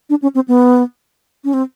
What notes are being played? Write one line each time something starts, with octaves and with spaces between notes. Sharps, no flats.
D4
C#4
C4
B3
C#4
C4